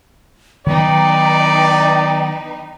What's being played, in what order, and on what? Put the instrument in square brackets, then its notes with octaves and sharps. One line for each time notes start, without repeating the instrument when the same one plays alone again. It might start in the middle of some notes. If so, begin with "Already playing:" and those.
[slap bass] D#3 F#3 B3 [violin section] D#4 B4 [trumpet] D5 [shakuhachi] G5